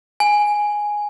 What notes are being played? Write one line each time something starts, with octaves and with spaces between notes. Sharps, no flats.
G#5